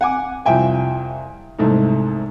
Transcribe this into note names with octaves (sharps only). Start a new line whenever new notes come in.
F#5 G#5 D6
C2 F2 E5 G5 G#5
C2 G#2 A3 D#4